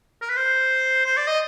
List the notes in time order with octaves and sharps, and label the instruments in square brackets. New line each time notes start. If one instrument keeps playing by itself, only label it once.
[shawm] A#4
B4
C5
C5
D5
D#5